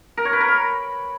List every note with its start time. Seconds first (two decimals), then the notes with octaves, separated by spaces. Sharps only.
0.17 A#4
0.25 C#5
0.33 B4
0.40 A#4
0.48 B5